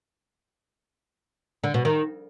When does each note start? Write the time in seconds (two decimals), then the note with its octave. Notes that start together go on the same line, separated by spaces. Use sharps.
1.64 D3
1.74 B2
1.85 D#3